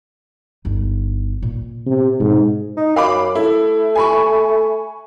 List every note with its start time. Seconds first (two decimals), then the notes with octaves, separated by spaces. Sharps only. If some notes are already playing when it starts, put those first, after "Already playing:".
0.65 G1 D#4
1.42 A#2
1.87 C3
2.20 G#2 B2
2.77 D#4
2.96 F#2 F5 B5 D6
3.35 A3 E4
3.95 G#5 B5 C#6